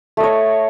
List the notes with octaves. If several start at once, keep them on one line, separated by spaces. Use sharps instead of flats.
A3 C#5 D#5